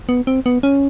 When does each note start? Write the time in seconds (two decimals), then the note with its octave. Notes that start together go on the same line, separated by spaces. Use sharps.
0.09 B3
0.27 C4
0.46 B3
0.63 C#4